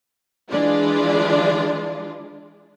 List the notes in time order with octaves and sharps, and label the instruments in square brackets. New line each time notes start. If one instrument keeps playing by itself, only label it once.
[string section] E3 G#3 D4 F4 D5